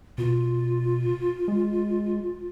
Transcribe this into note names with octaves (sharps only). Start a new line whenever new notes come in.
B2 F4
G#3